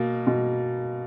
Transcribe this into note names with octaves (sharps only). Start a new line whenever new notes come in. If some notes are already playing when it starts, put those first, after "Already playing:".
Already playing: B2 A#3
B2